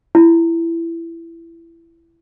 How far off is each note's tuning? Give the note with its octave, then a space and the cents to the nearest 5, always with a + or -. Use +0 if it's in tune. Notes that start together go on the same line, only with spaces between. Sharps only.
E4 +15